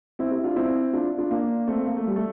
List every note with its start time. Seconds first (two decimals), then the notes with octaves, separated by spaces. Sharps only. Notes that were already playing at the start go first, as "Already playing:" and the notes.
0.19 C4 E4
0.31 E4 G4
0.44 D4 F4
0.56 C4 E4
0.93 D4 F4
1.18 D4 F4
1.31 A#3 D4
1.67 A3 C4
1.86 A#3
1.97 A3
2.07 G3
2.16 A3